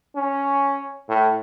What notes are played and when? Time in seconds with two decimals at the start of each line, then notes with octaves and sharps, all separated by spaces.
0.16 C#4
1.09 A2